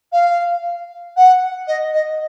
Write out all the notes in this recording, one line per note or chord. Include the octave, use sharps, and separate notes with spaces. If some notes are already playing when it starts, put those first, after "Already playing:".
F5
F#5
D#5
D#5